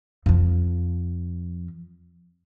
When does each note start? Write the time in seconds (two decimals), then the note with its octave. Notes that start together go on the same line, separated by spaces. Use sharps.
0.26 F2 F3